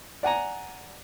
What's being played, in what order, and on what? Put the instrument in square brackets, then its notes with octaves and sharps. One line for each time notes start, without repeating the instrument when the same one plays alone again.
[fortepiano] D5 F#5 G#5 A#5